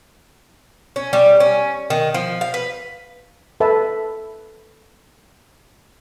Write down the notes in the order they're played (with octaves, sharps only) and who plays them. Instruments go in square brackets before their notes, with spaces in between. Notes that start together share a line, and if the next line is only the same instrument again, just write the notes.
[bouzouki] C#4
G3
C#4
D#3
F3
F5
B4
[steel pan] A4 B4 E5 A5